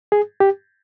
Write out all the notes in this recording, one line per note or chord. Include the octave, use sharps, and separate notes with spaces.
G#4
G4